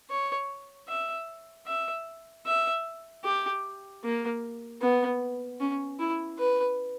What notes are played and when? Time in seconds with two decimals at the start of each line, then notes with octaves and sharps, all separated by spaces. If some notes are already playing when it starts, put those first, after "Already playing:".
0.10 C#5
0.88 E5
1.67 E5
2.46 E5
3.24 G4
4.04 A#3
4.81 B3
5.60 C#4
5.99 E4
6.39 B4